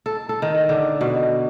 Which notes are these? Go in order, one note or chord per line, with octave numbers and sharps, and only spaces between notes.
A4
A4
D#3
D3
B2